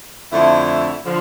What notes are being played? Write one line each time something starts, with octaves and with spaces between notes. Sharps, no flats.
F2 D3 A3 E4
D3 F3